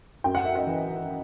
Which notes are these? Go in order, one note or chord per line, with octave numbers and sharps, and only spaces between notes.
F#2 G5
F#5
E5
D#5 F#5
E3